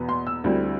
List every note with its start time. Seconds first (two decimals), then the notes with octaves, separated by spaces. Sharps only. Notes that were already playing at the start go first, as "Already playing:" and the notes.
Already playing: E2 B2 B3
0.09 C6
0.27 E6
0.44 D2 D3 G3 C4 E4